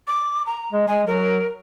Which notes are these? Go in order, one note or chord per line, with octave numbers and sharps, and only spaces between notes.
D6
A#5
G#3
G#3 G#5
F#3 A#4